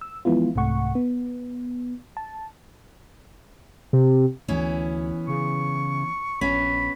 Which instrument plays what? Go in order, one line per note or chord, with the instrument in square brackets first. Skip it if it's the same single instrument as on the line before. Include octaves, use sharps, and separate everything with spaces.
[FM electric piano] E6
E3 F3 G#3 B3 E4 F4
C2 G#2 C3 A3 F#5 C#6
B3
A5
[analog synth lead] C3
[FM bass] D2 [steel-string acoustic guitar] E3 B3 C#4
[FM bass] C#3 [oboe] C#6
[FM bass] A#1 [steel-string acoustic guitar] B3 C#4 [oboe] B5